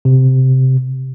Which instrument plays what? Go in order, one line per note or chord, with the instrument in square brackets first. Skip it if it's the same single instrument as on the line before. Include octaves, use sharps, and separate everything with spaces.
[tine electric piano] C3